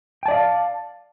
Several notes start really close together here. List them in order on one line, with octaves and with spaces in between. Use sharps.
G5 A5 D5 D#5 F5